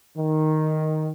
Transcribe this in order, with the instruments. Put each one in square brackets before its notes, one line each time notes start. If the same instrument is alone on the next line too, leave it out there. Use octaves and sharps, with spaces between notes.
[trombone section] D#3